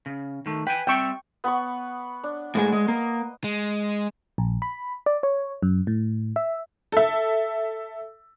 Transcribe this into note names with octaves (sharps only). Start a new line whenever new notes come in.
C#3
D#3 A3
B4 G5 G#5
G3 C4 E5 G5 C#6
B3 B5 C#6
D4
A2 G#3 G#4
G#3 D#5
A#3
G#3
A#1
B5
D5
C#5
F#2
A2
E5
A4 E5